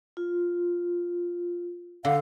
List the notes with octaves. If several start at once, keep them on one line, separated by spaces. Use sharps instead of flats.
F4
D3 F5